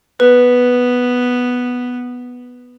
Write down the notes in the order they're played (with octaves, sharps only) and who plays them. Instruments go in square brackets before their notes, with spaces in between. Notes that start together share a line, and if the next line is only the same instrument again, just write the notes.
[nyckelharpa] B3 [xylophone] B4